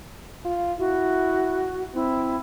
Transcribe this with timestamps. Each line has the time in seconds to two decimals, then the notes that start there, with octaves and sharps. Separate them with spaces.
0.45 F4
0.79 E4 F#4
1.95 C4 E4